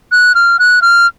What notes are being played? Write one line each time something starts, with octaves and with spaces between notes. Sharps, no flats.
F#6
F6
F#6
F6